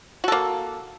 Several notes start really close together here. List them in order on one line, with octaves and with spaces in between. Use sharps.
F#4 A4 A#3